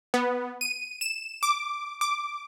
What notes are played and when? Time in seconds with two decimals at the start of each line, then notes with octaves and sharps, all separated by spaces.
0.14 B3
0.61 D#7
1.01 E7
1.43 D6
2.01 D6